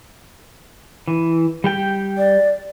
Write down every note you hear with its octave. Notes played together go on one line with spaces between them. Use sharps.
E3
G3 G4 G5
D5